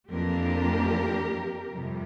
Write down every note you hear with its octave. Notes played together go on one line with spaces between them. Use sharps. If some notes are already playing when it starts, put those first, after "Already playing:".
F2 E3 A#3 D4 G4 A#4
F2 C3 G3